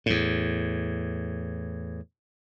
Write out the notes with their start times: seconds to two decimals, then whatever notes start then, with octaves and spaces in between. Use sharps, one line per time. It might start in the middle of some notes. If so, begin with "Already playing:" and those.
0.06 E2 A2